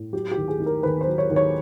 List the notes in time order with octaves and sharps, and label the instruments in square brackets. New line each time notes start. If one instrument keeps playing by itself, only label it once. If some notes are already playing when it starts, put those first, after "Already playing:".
Already playing: [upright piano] A2
F#3 G4
D#2 G4
G#4
D#3
A#4
D#2 B4
C5
F#3
C#5
D#2
C#5